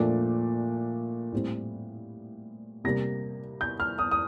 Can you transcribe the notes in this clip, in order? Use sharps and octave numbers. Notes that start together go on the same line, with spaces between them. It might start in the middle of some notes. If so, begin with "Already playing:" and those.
Already playing: A#2 F3 A3 D4
A2 G3 C4
C3 G3 A#3 A#6
G6
F6
D#6
D#6